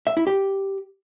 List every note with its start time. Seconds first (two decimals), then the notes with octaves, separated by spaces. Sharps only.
0.07 E5
0.17 E4
0.27 G4